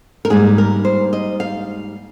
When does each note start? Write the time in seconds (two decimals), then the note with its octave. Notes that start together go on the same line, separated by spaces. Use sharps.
0.25 A#4
0.30 G#2 G3 A#3 G#4
0.58 A#4
0.85 C5
1.13 D#5
1.40 F5